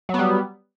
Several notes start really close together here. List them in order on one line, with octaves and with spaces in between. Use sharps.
F#3 B3 G3